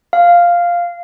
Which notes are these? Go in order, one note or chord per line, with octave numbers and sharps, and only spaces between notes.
F5